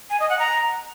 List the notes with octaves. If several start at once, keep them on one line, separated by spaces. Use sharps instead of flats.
G#5
D#5
F#5
A#5